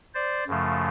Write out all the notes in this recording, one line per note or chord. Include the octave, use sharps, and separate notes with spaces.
C5 D5
F#2 C#3 F3 A3